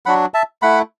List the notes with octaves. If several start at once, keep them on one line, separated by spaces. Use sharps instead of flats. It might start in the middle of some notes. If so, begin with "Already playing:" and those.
F#3 D4 F#4 F#5 B5
E5 A5
A3 E4 F#5 B5